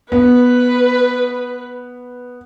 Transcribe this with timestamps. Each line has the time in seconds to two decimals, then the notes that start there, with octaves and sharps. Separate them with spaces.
0.12 B3 B4